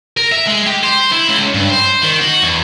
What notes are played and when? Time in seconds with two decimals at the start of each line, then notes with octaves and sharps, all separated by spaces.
0.17 A#4
0.32 E5
0.47 G#3
0.67 G4
0.84 C5
1.13 E4
1.29 C#2
1.54 G2
1.70 C5
2.02 D#3
2.20 F#4
2.43 E2